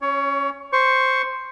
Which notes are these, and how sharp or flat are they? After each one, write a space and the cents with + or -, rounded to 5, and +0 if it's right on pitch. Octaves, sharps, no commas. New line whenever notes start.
C#4 -15 C#5 +20
C5 +0 C#6 +0